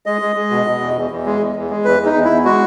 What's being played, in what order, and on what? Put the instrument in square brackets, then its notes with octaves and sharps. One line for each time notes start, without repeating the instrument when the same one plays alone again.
[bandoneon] G#3 D#5
G#3
G#3
B2
B2
E2
E2
E2
G#3
E2
E2
G#3
E2 B4
E2
D#4
E2
E4
E2
G#3 F#4